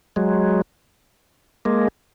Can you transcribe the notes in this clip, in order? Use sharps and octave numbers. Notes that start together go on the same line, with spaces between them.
F#3 G#3
G#3 A#3